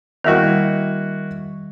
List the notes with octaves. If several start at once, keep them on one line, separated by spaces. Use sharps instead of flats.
D#3 G3 A#3 E4 F#4